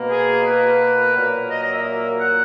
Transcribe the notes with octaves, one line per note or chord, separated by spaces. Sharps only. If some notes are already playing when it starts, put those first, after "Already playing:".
Already playing: B2 A#3
G#4
B4
A#2 F#3 A#3
D#5
D#5
E5
F#5